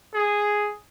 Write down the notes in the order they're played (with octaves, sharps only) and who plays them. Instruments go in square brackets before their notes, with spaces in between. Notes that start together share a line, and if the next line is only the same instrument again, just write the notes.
[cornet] G#4